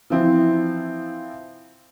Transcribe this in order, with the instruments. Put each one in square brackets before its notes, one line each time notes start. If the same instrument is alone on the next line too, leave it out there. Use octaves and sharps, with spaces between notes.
[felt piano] E3 F3 C4 E4